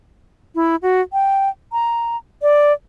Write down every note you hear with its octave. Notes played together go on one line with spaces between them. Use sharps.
E4
F#4
G5
A#5
D5